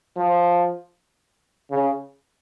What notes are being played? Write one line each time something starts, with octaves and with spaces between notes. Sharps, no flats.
F3
C#3